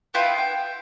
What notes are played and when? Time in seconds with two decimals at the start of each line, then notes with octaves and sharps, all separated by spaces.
0.14 B3 E4 F4 G5
0.38 G5